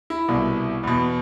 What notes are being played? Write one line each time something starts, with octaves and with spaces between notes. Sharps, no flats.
E4
C2 B2
E2 B2